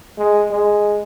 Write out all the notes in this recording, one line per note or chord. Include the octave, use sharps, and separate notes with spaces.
G#3
G#3